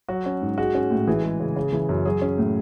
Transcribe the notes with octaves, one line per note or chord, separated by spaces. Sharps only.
F#3 F#4
C#4
G#2
G#3 F#4
C#4
A2
E3 G#4
G#3
C#3
C#3
E3
F#2
F#3 G#4
C#4
A2